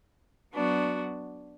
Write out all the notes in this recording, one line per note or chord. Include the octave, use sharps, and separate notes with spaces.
F#3 B3 D4 F#4